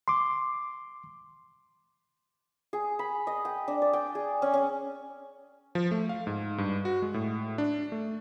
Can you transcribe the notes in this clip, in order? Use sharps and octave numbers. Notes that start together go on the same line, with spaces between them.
C6 D6
G#4
B5
D#5
G5
D4
D5
G5
G#4
C#4
C#4
F3
A3
F5
G#2
G2
F#4
G#3
A2
D4
A3